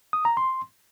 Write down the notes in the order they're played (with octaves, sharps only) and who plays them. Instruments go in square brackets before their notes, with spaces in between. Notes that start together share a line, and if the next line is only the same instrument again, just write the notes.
[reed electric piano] D#6
A#5
C6